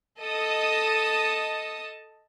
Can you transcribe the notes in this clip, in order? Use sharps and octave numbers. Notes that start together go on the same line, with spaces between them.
A4 D#5 A5 D#6